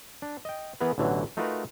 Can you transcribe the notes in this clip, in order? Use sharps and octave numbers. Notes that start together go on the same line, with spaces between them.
D4
D#5 G5
E3 B3 G#4 A#4 B4
A1 B2 D3 E3 F#3
A3 D#4 F4 F#4 A#4 B4